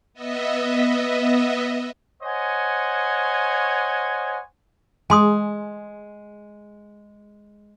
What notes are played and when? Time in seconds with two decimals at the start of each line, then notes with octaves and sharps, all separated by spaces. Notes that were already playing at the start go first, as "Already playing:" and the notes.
0.14 B3 D#5 E5
2.22 C5 C#5 D#5 F#5 G#5
5.10 G#3 G#5 C6 D#6